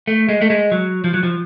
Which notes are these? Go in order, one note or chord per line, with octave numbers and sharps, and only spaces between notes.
A3
G#3
A3
G#3
F#3
F3
F#3
F3